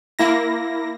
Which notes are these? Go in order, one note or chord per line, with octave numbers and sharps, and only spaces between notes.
A#3 E4 A#6